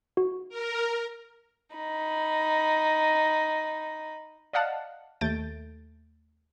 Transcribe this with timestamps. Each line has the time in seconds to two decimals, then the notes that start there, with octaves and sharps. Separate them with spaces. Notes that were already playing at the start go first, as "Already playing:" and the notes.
0.17 F#4
0.49 A#4
1.76 D#4 B5
4.53 D5 D#5 F5 F#5 A5
5.21 D#2 A3 G6 A6 D7